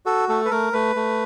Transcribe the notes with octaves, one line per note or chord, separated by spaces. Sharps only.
F#4 A4
A3 A4
B4
A3 A#4
A3 B4
A3